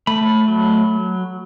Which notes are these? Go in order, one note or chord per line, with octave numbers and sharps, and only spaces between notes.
A3 B5
F#3